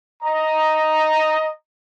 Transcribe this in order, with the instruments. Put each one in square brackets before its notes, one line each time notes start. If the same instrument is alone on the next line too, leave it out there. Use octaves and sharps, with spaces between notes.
[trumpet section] D#5 A#5